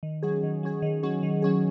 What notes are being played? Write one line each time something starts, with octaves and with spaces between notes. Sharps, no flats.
D#3
F#3 C#4 G#4
D#3
F#3 C#4 G#4
D#3
F#3 C#4 G#4
D#3
F#3 C#4 G#4